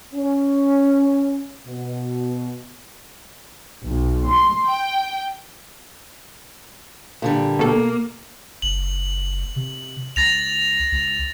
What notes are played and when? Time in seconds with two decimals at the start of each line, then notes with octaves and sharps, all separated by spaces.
0.14 C#4
1.67 B2
3.84 B1
4.27 C6
4.67 G5
7.22 A#2 D3 G3
7.59 B2 A#3 A4
8.62 F#1 F#7
9.56 C3
10.16 C#2 A6 A#6 F7
10.92 C#2